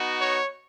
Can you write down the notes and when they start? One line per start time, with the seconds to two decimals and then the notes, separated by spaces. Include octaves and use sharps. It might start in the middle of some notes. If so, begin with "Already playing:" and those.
Already playing: B3 D#4 F#4
0.19 C#5